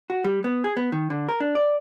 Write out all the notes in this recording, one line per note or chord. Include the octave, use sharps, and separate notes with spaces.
F#4
G3
B3
G#4
B3
D#3
D3
A#4
D4
D5